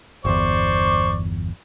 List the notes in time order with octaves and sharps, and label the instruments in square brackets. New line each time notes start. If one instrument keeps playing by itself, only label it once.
[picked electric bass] G1 E2 [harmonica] C5 D5 C#6